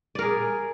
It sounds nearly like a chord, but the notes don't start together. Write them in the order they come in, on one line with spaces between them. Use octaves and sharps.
D5 A#4 G#4